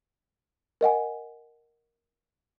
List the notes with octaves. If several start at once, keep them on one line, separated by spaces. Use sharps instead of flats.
A#4 D#5 F#5 G#5